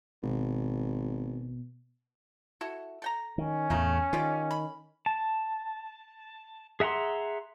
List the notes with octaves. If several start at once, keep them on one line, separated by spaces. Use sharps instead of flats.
G#1 B2
E4 F#4 A4
A4 G5 A#5
D#3 C#4
E2 A2 A3 A#3 D#4
D#3 F4 G4 D5
B5
A5
G#4 E5 F#5 A#5 C6